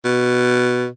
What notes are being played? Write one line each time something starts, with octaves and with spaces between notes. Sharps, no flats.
B2